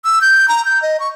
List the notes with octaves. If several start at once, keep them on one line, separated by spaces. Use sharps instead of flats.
E6
G6
A#5
G6
D#5
C#6